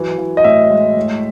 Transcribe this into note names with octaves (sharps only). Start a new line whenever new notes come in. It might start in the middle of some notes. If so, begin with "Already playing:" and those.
Already playing: E3 F#3
E3
D#5
A2 E5
G#3
A2